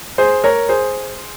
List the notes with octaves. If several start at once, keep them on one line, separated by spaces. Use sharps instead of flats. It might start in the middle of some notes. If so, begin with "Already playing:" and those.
G#4 C5
A#4 C#5
G#4 C5